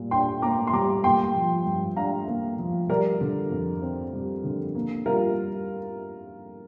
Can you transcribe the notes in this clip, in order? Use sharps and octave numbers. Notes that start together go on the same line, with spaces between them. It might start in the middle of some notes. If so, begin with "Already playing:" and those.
Already playing: A#2 G3
D4 G5 C6
A#3 A#5 D6
C6
G3 A#5 D6
A#3 G5 C6
F3
G2
D4 F5 A#5
A#3
F3
G3 A#4 D5
D3
F2
C4
G3
D3
A#3
G3 F4 A#4